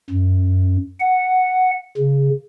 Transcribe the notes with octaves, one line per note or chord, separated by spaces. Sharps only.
F#2
F#5
C#3